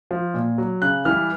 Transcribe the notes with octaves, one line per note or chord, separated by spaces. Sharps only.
F3
A#2
F#3
C#3 F#6
E3 G3 F6